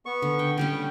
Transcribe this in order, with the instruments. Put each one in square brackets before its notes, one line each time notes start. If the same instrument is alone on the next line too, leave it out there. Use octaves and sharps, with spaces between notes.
[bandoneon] B3 C#6
[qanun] D3
G5
[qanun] D3 G3 C#4 [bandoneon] G5